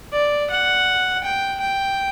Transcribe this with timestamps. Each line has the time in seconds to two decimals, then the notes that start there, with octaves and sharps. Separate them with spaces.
0.12 D5
0.50 F#5
1.24 G5
1.60 G5